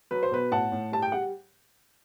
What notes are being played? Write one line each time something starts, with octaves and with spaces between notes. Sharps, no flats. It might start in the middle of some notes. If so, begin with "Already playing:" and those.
F#3 B4
C5
B2 B4
A2 F#5 A5
A2
G3 A5
G5
G3 F#5